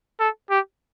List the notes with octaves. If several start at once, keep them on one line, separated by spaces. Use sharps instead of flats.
A4
G4